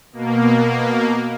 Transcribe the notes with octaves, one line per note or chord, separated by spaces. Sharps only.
B2 A#3